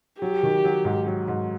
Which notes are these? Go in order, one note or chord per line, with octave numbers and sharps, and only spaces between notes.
F#3 G4
D#3
F#3
G#2
F#3
G#2